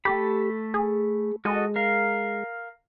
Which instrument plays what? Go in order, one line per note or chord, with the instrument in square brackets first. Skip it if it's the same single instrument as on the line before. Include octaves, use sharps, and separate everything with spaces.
[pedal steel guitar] A3 A4 B5 [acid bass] G4
[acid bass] G#4
[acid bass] G#3 [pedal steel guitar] F#4 A4 D#5
[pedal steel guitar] A#4 F5